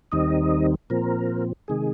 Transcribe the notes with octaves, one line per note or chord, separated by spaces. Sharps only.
D#2 D#3 G3 C4 D#4 D#5
A#2 F3 C4 A#4
C3 D#3 G#3 G#4